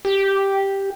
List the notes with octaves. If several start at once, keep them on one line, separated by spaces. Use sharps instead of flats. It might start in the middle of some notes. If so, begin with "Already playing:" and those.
G4